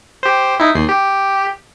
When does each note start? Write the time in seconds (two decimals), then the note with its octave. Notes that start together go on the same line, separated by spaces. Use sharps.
0.23 G4 C5
0.60 D#4 E4
0.75 D#2 C7
0.89 G4